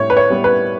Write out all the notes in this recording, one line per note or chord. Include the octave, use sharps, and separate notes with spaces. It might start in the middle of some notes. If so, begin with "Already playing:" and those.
Already playing: A2 G3 C#5
B4
C#5
G3 B3
B4